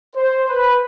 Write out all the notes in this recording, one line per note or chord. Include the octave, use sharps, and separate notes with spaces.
C5
B4